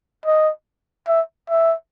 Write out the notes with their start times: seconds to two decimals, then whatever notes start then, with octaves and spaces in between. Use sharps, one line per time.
0.26 D#5
1.08 E5
1.50 E5